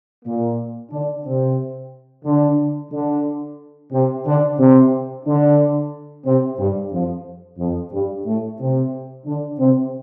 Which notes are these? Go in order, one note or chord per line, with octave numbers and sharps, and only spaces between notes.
A#2 A#3
D3 D4
C3 C4
D3 D4
D3 D4
C3 C4
D3 D4
C3 C4
D3 D4
C3 C4
G2 G3
F2 F3
F2 F3
G2 G3
A2 A3
C3 C4
D3 D4
C3 C4